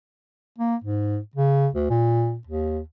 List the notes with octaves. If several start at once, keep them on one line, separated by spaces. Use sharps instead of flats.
A#3
G#2
C#3
D2
A#2
D#2